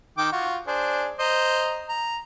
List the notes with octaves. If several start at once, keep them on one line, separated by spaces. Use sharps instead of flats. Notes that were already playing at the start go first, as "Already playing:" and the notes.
D#3 G5 D6
F4 F#4
D4 G#4 C5
C5 D#5 A#5
A#5